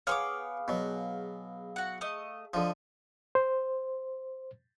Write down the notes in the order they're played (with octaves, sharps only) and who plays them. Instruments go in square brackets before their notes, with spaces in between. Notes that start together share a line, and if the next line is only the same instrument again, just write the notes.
[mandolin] B3 C#6 D6 [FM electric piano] G#4 F5 [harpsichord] C#5
[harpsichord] B2 F#3
[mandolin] F#4 F#5
A3 D#5
[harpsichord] D3 F3 [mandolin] D#5
[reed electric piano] C5